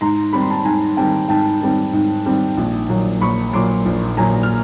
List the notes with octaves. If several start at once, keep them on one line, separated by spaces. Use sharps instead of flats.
G#2 A#5 C6
D#3 G3 C4 B5
C6
A5 B5
G#2 G#5 A#5
D#3 G3 C4 G5 A5
G#2 G5 A5
D#3 G3 C4
G#2
D#3 G3 C4
A#1
A#2 F#3
A#1 B5 C#6
A#2 F#3 C6 D6
A#1
A#2 F#3 G#5 A#5
F6